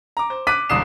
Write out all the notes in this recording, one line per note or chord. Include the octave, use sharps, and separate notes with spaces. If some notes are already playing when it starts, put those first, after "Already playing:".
A#5 D6
C5
D6 F#6 B6 D#7
E1 C2 D3 D#6 C7 E7